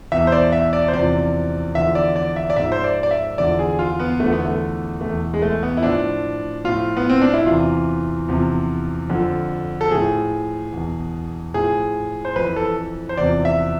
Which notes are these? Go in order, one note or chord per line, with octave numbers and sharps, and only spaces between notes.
E2 B2 E5
C5
D5
E5
D5
C5
E2 C3 F3 D5
E2 D3 F3 E5
D5
D5
E5
D5
G#2 F3 E5
C5
D5
D5
E5
E2 D3 F3 D5
G#4
F4
B3
E2 D3 F3 A3
B3
A3
E2 B2 A3
G#3
A3
B3
E4
A2 F3 D4
A2 F3 F4
B3
C4
D4
E4
E2 C3 E3 F4
E2 C3 F3
F2 D3 F3
A4
A2 F3 G#4
E2 B2
A2 F3 G#4
C5
F2 E3 B4
A4
C5
E2 C3 F3 D5
E5